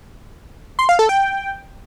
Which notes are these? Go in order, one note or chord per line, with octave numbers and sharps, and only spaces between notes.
C6
F5
A4
G5